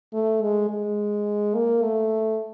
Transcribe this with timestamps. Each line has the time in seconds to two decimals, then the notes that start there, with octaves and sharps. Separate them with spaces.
0.13 A3
0.42 G#3
0.70 G#3
1.55 A#3
1.82 A3